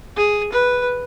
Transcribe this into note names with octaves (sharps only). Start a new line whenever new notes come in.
G#4
B4